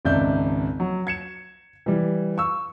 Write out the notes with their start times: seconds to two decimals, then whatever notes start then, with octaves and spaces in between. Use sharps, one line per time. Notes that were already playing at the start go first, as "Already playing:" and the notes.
0.05 G#1 C#2 D5 E5 G6
0.80 F#3
1.07 G#6 C#7 E7
1.86 E3 G3
2.38 C#6 E6